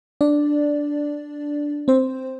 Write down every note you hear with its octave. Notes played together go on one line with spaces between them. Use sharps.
D4 D5
C4 C5